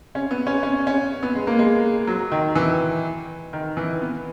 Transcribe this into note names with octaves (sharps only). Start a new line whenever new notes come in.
C#4
B3
C#4
C#4
C#4
B3
G#3
A#3
G#3
F#3
D#3
E3
D#3
E3
B3